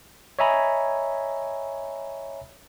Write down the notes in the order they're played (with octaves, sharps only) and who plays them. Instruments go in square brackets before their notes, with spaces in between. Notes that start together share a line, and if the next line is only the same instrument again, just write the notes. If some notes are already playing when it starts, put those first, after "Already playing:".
[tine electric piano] C#5 D#5 E5 G#5 A#5 B5